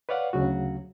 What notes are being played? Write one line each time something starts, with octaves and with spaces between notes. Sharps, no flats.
B4 C#5 D5 F5 F#5
D2 C#3 F#3 F#4